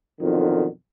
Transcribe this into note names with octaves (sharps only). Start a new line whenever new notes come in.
B1 F2 D3 D#3